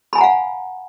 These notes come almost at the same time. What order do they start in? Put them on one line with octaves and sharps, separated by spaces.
B5 G#5 A#5 F#5 F5